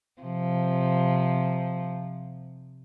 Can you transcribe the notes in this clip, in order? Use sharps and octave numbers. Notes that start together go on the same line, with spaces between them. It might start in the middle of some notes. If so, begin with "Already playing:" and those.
C3 F3